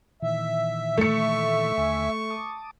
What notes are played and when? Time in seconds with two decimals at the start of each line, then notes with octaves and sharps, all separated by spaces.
0.22 A#2 D#3 E3 E5
0.98 A3 C#6 C#7
1.78 D#2 D3 G#5
2.30 A5 D6 D#6